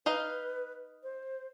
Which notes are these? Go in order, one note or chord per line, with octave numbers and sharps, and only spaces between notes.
D#4 B4 D#5 F5
C5